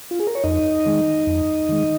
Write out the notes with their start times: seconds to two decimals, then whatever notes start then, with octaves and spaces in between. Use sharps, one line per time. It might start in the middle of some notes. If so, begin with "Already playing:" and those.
0.11 F4
0.20 G#4
0.27 A#4
0.35 C#5
0.44 F2 D#4 D#5
0.86 D#3 G#3
1.27 F2
1.69 D#3 G#3